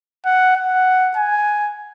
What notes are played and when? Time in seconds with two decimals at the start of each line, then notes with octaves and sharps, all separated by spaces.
0.25 F#5
0.56 F#5
1.16 G#5